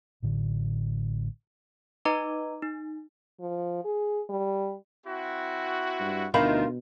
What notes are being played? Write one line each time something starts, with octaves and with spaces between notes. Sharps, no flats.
A1 A2 D3
D#4 B4 D#5 A#5 D6
D#4
F3
G#4
G3
C4 E4 F#4
G2
D2 B2 D#3 F4 A#4 F5 B5